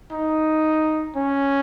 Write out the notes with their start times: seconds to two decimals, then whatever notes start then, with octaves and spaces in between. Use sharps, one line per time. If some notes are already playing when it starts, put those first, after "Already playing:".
0.12 D#4
1.16 C#4